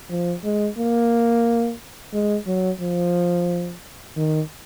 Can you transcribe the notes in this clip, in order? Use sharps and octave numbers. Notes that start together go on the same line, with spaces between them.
F3
G#3
A#3
G#3
F#3
F3
D#3